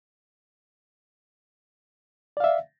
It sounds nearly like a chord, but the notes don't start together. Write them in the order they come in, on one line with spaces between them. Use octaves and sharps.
D5 F5 E5